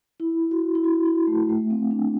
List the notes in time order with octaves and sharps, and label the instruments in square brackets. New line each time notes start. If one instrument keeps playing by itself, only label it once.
[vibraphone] E4
F#4
E4
F#4
E4
A3
A3
C4
D4